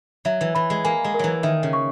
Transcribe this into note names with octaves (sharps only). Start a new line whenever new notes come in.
F#3 E5
E3
E3 B5
G#3
A#3 G#5
G#3
A#4
E3 F#3
D#3 E5
C#3
C#6